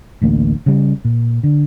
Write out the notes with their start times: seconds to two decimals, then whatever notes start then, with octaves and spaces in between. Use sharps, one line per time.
0.22 A1 D2 A#3
0.66 C#3 G3
1.05 A#2
1.44 D3